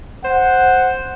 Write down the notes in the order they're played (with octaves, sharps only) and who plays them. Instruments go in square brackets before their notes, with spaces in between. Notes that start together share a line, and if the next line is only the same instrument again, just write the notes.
[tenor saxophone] C5 [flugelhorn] F#5